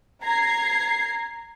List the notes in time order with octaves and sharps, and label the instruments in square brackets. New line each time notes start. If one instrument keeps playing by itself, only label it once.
[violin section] A#5 G#6 C7